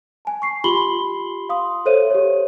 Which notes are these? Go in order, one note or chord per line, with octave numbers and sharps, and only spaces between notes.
G#5 A5
C#6 C7
F4 G4 B5 C6 F#7 G7
F5 C6 D#6
A4 C5 C#5 E5 D#7
G4 C#5